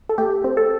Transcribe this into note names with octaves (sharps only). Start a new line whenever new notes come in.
A4
A3 G4
C4
A4